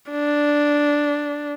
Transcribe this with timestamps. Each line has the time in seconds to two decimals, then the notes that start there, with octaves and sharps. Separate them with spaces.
0.11 D4